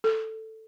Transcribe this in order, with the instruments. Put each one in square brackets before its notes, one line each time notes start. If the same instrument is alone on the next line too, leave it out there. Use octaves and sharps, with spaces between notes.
[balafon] A4